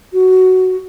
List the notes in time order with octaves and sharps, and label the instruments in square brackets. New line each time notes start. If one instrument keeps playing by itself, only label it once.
[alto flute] F#4